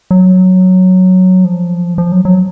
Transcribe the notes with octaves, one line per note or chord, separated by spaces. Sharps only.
F#3
F3
F3
F#3
F#3